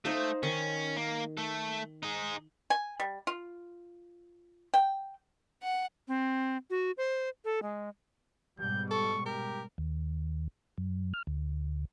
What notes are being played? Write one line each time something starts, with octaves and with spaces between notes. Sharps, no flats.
A3 D#4 C5 F5
D#3 C#4
A#3
A3 A4
D#4 G#4
G#5
G3
F4
G5
F#5
C4
F#4
C5
A4
G#3
G#2 B2 G3 G6
A4 C#6
G4 A#4
D#2
F#2
F6
D2